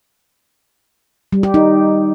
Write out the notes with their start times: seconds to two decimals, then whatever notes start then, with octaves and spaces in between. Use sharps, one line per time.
1.33 G3
1.43 G4
1.54 D#4